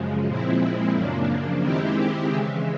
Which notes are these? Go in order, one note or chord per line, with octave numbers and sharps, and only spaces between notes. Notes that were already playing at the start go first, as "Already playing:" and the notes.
Already playing: F#2 C#3 F3 G#3
A#2 F3 G#3 C4 E4
F#2 C#3 F3 A#3 D4
D#3 G#3 C4 E4 G4
C#3 E3 G#3